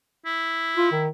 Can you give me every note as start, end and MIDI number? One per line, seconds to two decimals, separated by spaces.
0.25 1.08 64
0.77 0.90 65
0.92 1.09 51